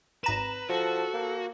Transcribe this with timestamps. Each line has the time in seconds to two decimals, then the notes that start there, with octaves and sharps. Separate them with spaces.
0.24 G#1 B4 A#5 E7
0.69 F3 F#4 A4
1.14 A#3